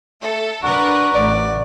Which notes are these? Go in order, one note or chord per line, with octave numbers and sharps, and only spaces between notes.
A3 A4
D4 F#4 A#4 B4
A1 D5